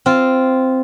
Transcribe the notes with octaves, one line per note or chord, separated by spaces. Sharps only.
C4 F4